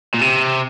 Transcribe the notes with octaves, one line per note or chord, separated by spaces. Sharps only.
A#2
C3